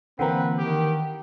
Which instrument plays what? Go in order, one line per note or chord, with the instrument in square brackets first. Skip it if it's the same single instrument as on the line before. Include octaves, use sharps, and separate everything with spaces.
[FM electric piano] D3 E3 A#3 [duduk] C4 [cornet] B4 [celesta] F#5 A#5
[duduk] D#3 [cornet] G4